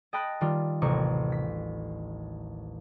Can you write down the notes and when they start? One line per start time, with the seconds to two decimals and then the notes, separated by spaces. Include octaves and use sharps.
0.13 D#5 G5 A5 B5 F#6 A#6
0.41 D#3 G3 F4
0.82 A1 D#2 C3 A#5 C#6
1.32 B6